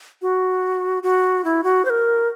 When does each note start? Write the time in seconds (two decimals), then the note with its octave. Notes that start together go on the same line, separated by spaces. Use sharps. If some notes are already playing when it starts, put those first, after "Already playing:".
0.22 F#4
1.03 F#4
1.44 E4
1.64 F#4
1.85 C5
1.90 A#4